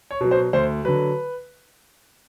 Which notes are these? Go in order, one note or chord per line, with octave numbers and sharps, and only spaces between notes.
C#5
B2 F#3
C5
D2 C5
D3 F#3 B4